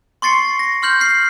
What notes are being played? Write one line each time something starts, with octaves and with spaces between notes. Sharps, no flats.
C6 C#6 A6 C7 C#7
A#6
C6 F6 G6 F#7
F6 C7